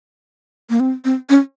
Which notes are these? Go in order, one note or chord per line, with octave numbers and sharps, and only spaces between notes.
A#3
C4
C4
C#4